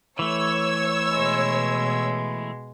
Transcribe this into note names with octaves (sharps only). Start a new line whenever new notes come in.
E3 A3 C#5 E6
B2 G#3